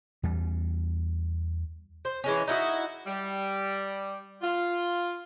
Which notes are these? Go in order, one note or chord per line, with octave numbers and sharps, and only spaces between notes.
E2 G3
C5
E3 G#3 C#4
D#4 E4 F#4 D#5
G3
F4